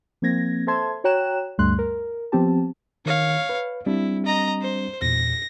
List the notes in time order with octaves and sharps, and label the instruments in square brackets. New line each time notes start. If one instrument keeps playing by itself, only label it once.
[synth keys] F3 A#3 C4 G#6 A#6
A4 C5 E5 A5 C6 G#6
F#4 C#5 G5 A#5 F#6 E7
D2 G2 G3 A3 C6 F#6
A#4
F3 B3 C4 G4 A5
[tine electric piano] D#3 [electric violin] C#5 F5
[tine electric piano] B4
[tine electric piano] G3 C4 D4 [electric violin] E4
[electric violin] D#5 A#5
C5
[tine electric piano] E2 A#2 [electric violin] A#6